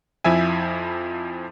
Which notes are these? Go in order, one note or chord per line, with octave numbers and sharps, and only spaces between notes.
F2 F3 E4 E5 G#5